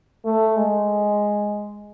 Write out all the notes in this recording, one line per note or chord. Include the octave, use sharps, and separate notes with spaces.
A3
G#3